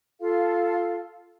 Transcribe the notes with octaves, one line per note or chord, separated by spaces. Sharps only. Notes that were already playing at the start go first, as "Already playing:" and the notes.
F4 A4 F5